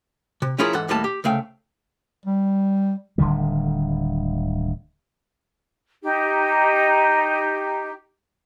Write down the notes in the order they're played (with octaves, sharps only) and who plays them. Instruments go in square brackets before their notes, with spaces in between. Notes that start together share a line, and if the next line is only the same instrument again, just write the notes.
[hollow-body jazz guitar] C3
F3 C#4 E4 F4 G#4 A#4
G#2 E3 A4 F#5
D#2 A2 G3 A#3 G#4 A5
G4
C2 C#3 A3 F5 G5
[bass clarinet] G3
[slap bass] D1 D3 D#3 G3
[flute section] D#4 G4